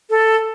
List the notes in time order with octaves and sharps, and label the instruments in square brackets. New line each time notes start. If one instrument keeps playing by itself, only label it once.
[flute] A4